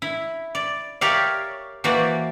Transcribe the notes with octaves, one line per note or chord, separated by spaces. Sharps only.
E4
D5
G4 A#4 C#5 D5 E5 F5
E3 A#3 F#4 C5 D5